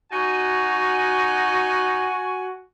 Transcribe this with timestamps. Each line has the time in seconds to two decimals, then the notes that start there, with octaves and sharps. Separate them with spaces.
0.12 D#4 F#4 G#5